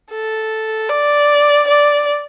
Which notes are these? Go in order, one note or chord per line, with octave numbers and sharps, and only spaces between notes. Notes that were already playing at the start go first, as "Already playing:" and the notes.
A4
D5
D5